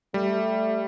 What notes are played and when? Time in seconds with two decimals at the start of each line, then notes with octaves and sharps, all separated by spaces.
0.14 G3 A3